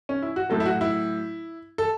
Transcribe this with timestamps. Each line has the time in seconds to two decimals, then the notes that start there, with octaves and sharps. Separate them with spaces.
0.09 C#4
0.22 E4
0.36 F#4
0.50 A2 F#3 A4
0.60 E4
0.66 F#4
0.81 E4
1.78 A4